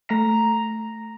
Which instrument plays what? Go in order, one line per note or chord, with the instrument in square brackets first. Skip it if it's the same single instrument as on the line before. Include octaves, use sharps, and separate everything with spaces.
[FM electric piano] A3 [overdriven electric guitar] A#5